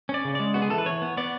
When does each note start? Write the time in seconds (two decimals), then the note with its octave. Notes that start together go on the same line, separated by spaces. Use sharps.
0.09 C#4
0.14 D5
0.25 C#3
0.35 G#3 D5
0.54 B3 F#4
0.62 G#4
0.70 E3 A4
0.78 B4
0.86 E3 C#5
1.02 B3
1.17 B3 D5